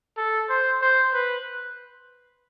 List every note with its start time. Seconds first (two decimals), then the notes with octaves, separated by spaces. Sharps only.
0.17 A4
0.49 C5
0.82 C5
1.13 B4